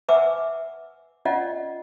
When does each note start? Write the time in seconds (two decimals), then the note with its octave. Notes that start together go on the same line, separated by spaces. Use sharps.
0.09 B4 E5 F#5 G#5 D6 E6
1.25 C#4 F4 D5 D#5 F#5